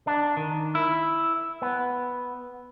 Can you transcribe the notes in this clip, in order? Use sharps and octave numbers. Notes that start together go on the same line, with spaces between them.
D4
D#3
E4
B3